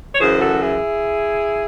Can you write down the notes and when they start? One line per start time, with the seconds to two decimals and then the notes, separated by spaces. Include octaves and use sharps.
0.15 C#5
0.20 F#2 C#3 E3 G#4 C5
0.41 F#4 A4
0.62 E4 G#4